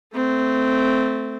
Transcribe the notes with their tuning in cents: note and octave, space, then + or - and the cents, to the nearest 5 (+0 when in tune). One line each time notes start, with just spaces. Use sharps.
A3 +0 C4 -15